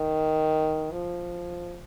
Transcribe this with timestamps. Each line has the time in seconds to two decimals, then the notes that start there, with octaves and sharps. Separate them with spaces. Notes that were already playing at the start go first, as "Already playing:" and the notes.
Already playing: D#3
0.91 F3